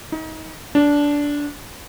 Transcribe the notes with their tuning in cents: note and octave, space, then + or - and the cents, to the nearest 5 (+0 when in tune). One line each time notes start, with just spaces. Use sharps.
D#4 +30
D4 -15